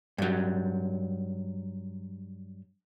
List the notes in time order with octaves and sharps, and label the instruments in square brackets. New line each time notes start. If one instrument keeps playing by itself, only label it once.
[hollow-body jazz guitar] G2 F#3